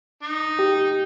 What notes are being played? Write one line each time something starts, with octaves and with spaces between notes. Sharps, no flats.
D#4
G4